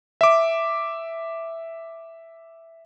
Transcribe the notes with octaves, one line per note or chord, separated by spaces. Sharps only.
E5 D6